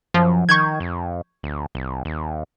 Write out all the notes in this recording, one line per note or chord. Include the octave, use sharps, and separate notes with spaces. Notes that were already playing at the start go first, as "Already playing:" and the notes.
F#2 F3
D#3 C#6 G6 G#6
F2
D2
C2
D#2